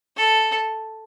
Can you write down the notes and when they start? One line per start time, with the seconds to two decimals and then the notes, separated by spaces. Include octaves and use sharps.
0.16 A4